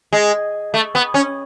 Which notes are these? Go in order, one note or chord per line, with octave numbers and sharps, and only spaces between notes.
G#3
A3
B3
C#4